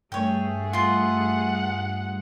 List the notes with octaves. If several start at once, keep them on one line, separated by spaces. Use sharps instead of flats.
G2 A3 G#4 C#5 G5
F4 F#5 C6